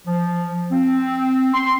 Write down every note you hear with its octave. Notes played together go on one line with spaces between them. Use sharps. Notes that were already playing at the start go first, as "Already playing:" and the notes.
F3
C4
C6